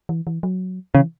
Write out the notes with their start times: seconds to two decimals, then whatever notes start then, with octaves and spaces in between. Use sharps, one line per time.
0.09 E3
0.27 E3
0.43 F#3
0.95 C#3 E3